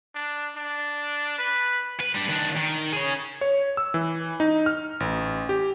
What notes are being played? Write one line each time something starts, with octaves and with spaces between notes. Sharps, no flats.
D4
D4
B4
B4
G3 D4
D#3 D4
D#3
G#4 C#5
C#5
E6
E3
D#4
F6
A1
G4